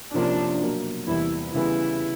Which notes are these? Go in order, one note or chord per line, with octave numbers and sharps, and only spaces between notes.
C3 F3 A#3 C#4 D4 F4
B2 F#3 A#3
E2 C3 E3 G3 A#3 E4
C#3 E3 G3 B3 E4